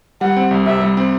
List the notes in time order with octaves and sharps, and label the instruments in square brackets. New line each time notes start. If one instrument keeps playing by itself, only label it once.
[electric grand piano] G3 [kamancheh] F#5
[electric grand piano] C4
C2
[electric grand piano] C3 [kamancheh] E5
[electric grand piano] G3
C4